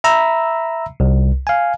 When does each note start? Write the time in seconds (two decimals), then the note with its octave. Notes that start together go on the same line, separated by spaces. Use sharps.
0.04 E5 A#5 B5 E6
1.00 C2
1.47 F5 G#5